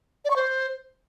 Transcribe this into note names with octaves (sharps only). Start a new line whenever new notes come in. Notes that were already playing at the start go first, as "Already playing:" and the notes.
D5
C#6
C5